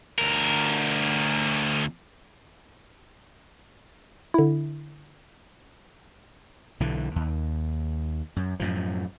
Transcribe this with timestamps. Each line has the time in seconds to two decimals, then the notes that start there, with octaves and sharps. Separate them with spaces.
0.18 D2 A#4
4.34 D3 E4
6.80 B1 D3 E3
7.16 D#2
8.36 F#2
8.60 F#2 A2 F3